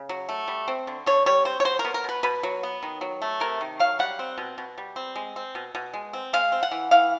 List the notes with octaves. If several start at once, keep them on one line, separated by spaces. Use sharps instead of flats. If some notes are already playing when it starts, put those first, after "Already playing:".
Already playing: C#3
F#3
A3
G3
C4
D3
D3 C#5
G3 C#5
C4 C5
C#5
F#3 C5
A#4
B3
A#4
B2 B4
B2 B4
F#3
B3
D#3
F#3
A3
C3 A#4
D#3
F#3 F5
G3 F#5
C4
B2
B2
G3
C4
G#3
C4
B2
B2
G#3
C4
G#3 F5
C4
F#5
E3
E3 F5